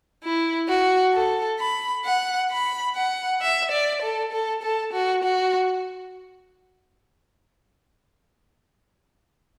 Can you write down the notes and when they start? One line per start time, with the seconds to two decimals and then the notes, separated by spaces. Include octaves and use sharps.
0.24 E4
0.68 F#4
1.14 A4
1.60 B5
2.05 F#5
2.51 B5
2.95 F#5
3.42 E5
3.72 D5
4.02 A4
4.32 A4
4.63 A4
4.93 F#4
5.24 F#4